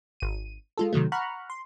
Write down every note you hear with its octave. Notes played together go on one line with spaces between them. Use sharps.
G#1 D#7
G#3 F4 A4
C3 D#3 F#3 A3
F#5 A#5 B5 C#6 F6 F#6
C6